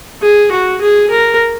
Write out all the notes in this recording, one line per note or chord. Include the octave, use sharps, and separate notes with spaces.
G#4
F#4
G#4
A#4